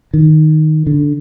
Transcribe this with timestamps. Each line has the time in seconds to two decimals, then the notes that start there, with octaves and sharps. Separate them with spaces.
0.14 D#3
0.87 D3